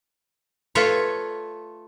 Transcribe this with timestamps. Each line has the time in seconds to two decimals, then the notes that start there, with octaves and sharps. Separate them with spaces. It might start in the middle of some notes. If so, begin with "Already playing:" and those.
0.75 A3 F4 A4 B4 C#5